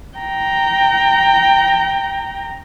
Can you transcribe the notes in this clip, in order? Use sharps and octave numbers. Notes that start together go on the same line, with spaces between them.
G5 A#5